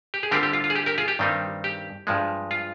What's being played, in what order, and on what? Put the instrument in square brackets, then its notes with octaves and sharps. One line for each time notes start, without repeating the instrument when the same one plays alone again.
[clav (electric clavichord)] G4
G#4
D3 G3 C4 F4 G4 A#4
G4
F4
F4
G#4
G4
G4 A#4
F4 G#4
G4
G2 D#3 G3 C4 D#4
G4
G2 F3 G#3
F4